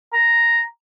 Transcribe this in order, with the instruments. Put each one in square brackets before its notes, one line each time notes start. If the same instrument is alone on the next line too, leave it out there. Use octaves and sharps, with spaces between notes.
[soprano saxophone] A#5